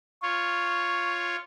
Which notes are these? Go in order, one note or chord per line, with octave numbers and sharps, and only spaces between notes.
F4 C#5 C#6